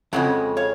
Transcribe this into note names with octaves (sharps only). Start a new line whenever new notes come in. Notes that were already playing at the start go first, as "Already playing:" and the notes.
F2 C#3 G#3 F#5
C#5 F5